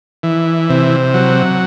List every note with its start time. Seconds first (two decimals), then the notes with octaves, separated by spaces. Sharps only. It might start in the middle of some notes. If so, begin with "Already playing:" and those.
0.23 E3
0.69 C3
1.14 F#3